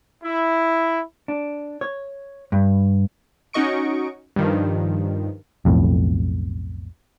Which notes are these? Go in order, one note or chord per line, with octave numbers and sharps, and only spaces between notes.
E4
D4
C#5
G2
C#4 D#4 F#4 D#5 C#6 D7
G2 D#3 F3
B1 F2 A2